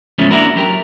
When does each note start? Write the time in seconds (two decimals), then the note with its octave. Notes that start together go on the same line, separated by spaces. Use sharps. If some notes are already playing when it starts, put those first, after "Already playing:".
0.18 E2 G#2 C#3 F3 A3 C#4
0.31 A#3 D4 E4 F#4 A#4
0.56 F#3 G4 A#4